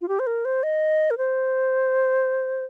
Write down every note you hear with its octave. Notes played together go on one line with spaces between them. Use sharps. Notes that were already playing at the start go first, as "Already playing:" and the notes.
F4
G4
C5
A#4
C5
D#5
A#4
C5